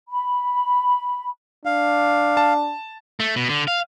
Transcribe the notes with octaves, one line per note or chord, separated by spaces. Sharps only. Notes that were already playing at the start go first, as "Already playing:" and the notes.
B5
D4 F5
A5
A3
B2
D3
F5